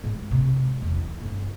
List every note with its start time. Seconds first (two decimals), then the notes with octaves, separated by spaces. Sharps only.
0.04 G#2
0.31 C3
0.56 G#3
0.82 E2
0.96 E4
1.21 G1